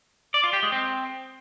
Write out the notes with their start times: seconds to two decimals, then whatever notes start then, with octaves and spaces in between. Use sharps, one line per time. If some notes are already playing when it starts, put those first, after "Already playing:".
0.34 D5
0.44 F4
0.53 G4
0.63 G#3
0.72 C4